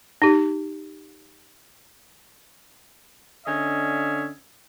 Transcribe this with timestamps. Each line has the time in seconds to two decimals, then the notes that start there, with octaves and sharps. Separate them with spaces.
0.22 D#4 G4
3.46 D3 C#4 D#5 E5